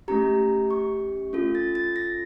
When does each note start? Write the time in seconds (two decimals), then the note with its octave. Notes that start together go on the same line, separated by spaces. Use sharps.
0.08 A3 C#4 G4 A#5
0.71 C#6
1.33 C#4 F4 A4
1.55 A6
1.75 A6
1.96 A#6